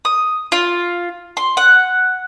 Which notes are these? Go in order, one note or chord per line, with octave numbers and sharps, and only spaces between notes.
D#6
F4
C6
F#5